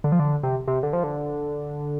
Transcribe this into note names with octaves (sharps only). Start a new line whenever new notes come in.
D3
F3
D3
C3
C3
D3
F3
D3